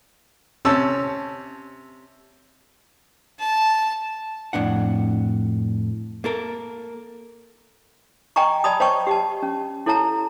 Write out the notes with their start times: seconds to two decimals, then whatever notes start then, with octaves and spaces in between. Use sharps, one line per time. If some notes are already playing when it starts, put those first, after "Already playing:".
0.65 C3 C#4 A5 E6
3.39 A5
4.53 F2 A2 D4 F#5
6.24 A#3 A4 A#4
8.36 D#5 G5 G#5 A#5 C#6
8.64 D5 A5 B5 D#6
8.80 C5 C#5 D#5 G5 A5 C#6
9.07 G4 D#5 A5
9.43 C#4
9.86 E4 A4 C#5 A5 A#5